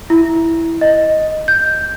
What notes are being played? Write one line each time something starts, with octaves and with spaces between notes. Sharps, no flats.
E4
D#5
G6